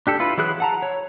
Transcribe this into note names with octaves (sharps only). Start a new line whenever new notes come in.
D4 G4 A4
E4 F4 B4
E3 F#3 E4 G#4 F#6
F#5 A5 A#5
C#5